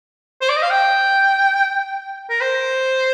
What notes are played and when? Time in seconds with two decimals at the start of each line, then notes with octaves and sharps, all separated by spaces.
0.41 C5
0.49 D5
0.56 D#5
0.63 F5
0.70 G5
2.30 A#4
2.41 C5